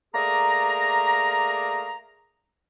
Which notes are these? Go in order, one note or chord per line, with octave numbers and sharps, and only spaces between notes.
A3 A#3 G#4 D5 A#5